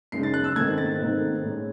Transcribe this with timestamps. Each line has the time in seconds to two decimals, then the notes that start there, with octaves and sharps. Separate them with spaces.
0.12 F#2 C#3 G#3 D#4 C7
0.23 A6
0.34 F#6
0.44 E6
0.56 G#2 D#3 A3 C4 D#4 G#6
0.78 A6
0.99 G#2 D#3 A3 C4 D#4
1.43 A2 G#3 C#4